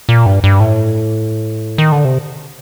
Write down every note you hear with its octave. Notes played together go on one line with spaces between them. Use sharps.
A#2
G2
G2
A2
D#3
D3
C3